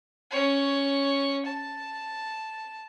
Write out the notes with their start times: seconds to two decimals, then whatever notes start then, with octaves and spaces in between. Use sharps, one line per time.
0.31 C#4 C#5
1.45 A5